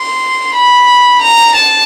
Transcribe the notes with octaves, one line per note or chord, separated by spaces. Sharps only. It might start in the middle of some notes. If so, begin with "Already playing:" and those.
Already playing: C6
B5
A#5
A5